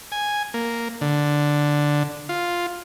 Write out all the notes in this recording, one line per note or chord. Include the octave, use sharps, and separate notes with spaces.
G#5
A#3
D3
F4